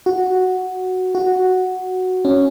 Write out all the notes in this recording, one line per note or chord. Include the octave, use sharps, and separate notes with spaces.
F#4
F#4
C#4